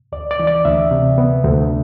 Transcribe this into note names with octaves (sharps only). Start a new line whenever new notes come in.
D2 D5
D5
E3
D5
D2 E5
C3
B3
D2